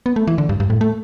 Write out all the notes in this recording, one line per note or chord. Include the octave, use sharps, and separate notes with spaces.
B3
A3
E3
D3
G2
G2
A2
A3